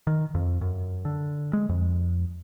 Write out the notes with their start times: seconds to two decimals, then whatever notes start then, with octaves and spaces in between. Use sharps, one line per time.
0.07 D#3
0.35 F2
0.61 F#2
1.05 D3
1.53 G#3
1.69 F2